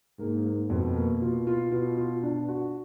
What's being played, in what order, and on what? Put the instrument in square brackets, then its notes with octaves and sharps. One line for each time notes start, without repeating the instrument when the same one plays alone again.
[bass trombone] G#2 [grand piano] A#3
[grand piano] A#3
[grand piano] F2 [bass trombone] B2
[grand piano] A#3
[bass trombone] B2 [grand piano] F4
[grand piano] F4
[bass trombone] B2 [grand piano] F4
[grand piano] F4
D4
F#4